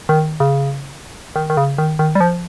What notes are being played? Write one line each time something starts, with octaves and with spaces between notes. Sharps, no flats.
D#3
C#3
D#3
D#3
C#3
D#3
D#3
G3
F3